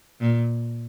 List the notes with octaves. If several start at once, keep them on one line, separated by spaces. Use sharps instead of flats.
A#2